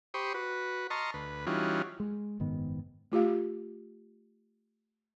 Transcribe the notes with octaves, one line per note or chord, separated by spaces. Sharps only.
G4 C5 B5 C#6 D#6
F#4 B4
D#5 A5 A#5 C6 C#6 F6
D2 B4
E3 G3 C#4 D#4 F4 F#4
G#3
F#1 G#2 D#3 B3
A3 F4 G4 F5